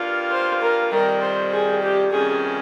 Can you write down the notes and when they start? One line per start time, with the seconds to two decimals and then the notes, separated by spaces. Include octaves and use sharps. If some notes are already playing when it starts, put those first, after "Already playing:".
Already playing: G2 G3 A#3 F4
0.32 C5
0.62 A#4
0.91 F2 C3 D#3 G3 A#4
1.22 C5
1.53 G#4
1.83 G4
2.12 F2 C3 D#3 G3 C#4 G#4